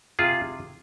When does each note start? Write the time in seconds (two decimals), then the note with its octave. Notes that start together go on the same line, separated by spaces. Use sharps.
0.19 C3 F4 G#4